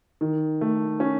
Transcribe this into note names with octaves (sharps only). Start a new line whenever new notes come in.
D#3
A3
C#4